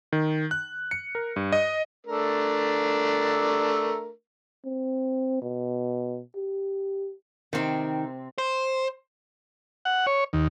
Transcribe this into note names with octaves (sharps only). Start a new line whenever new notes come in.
D#3
F#6
C#7
A#4
G2
D#5
A3 D4 A#4
C4
B2
G4
C3 D#3 C4
C5
F#5
C#5
D#2